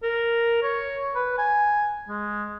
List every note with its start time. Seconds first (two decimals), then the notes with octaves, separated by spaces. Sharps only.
0.03 A#4
0.63 C#5
1.15 B4
1.38 G#5
2.09 G#3